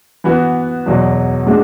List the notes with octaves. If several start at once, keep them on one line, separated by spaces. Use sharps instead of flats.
E3 B3 F#4
E2 B2 F#3
A2 G#3 D4 F#4